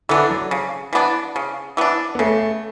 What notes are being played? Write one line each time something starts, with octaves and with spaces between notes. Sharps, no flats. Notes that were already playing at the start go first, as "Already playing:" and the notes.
D3 E3 B3 D4
F#3
C#3
E3 B3 D4
C#3
E3 B3 D4
B3
C#3 A3